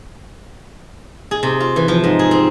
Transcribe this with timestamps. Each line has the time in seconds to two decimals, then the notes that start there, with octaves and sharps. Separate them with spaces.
1.31 G#4
1.43 C3
1.60 F4
1.76 E3
1.88 F3
2.04 G#2
2.19 G#4
2.31 C4